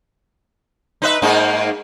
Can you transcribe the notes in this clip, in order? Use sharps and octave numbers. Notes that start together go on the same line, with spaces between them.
D#4 B4 E5
G#2 A#3 D#4